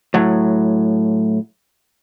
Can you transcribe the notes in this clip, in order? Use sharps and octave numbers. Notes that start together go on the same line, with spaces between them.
A2 F#3